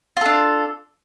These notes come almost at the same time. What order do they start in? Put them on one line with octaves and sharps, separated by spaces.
F4 A4 D4